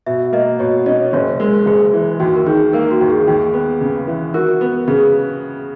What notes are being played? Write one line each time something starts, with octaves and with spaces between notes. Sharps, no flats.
B2 E5
A#3 D#5
B2 C#5
C#4 D#5
F#1 C#5
G#3 A#4
F#1 G#4
E3
D#2 F#4
A#4
D#3 G#4
A#3 A#4
F#4
D#2
G#4
D#2
B3
C#3
E3
F#4 A#4
B3
C#3 G#4